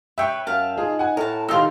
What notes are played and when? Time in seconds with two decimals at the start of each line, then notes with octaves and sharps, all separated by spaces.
0.18 B4 C#5 E5 G5
0.47 F#2 F5 A5
0.77 D#4 F4 G#4
0.99 F#5 G#5
1.17 A2 A#4 A5
1.49 D#3 D#4 F4 G4 E6